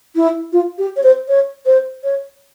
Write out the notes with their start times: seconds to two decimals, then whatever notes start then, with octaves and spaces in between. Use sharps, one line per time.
0.16 E4
0.53 F4
0.78 G4
0.96 C#5
1.03 C5
1.28 C#5
1.66 C5
2.04 C#5